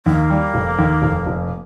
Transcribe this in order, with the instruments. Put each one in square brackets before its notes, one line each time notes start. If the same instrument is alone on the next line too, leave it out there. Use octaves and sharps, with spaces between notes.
[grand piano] D#2 [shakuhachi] A#3
[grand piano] G3
F1
D#2
F1
F1